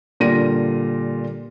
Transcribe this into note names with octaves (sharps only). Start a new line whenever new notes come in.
A#2 D3 G3 F4 A#6 D#7